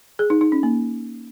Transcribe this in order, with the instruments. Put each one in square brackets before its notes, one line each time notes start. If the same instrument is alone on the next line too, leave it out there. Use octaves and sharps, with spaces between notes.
[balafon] G#4
D#4
D#4
C#4
A#3